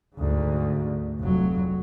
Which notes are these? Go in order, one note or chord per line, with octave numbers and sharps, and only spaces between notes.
D2 G#2
F1 F#3